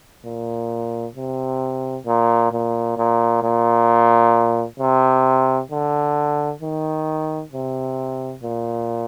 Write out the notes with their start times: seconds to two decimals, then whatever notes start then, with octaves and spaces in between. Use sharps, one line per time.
0.25 A#2
1.16 C3
2.06 A#2
2.52 A#2
2.97 A#2
3.43 A#2
4.80 C3
5.71 D3
6.62 D#3
7.53 C3
8.43 A#2